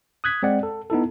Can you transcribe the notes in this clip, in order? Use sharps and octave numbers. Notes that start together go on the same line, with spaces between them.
D#6 F#6 G#6 B6
G#3 C4 D5 F#5
A4
B3 D#4 E4 A4